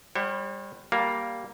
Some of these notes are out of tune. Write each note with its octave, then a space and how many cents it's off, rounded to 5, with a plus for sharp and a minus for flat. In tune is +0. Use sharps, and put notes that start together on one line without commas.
G3 +25 C#5 -45 F#5 +30
G3 +0 A#3 +0 F5 +10